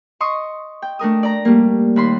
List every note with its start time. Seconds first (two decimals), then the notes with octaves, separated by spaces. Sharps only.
0.20 D#5 C6 C#6 D#6
0.82 G5
0.99 A3 D4 A#4 D#6
1.23 D5 A#5
1.45 G3 A3 A#3
1.96 D#2 B5 C6